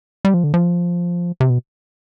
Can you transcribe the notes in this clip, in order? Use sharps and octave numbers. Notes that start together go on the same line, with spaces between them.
G3
F3
D3
F3
C3
B2